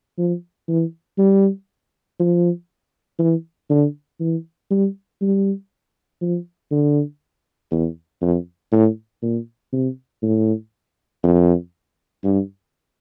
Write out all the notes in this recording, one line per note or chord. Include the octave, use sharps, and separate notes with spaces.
F3
E3
G3
F3
E3
D3
E3
G3
G3
F3
D3
E2
F2
A2
A#2
C3
A2
F2
G2